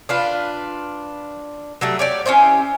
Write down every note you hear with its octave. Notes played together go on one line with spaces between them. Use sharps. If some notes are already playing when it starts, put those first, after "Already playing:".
D4 F4 B4
F#3 G3 A3
G4 C#5 D5
C#4 E4 G4 C5